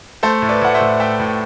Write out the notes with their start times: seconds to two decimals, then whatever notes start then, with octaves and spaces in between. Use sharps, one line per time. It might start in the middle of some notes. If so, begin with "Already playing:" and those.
0.23 A3 A4 C5
0.42 A2
0.49 B4 D5
0.62 A2 F#5
0.74 C5 E5
0.81 A2
1.00 A3 E5 G5
1.20 A2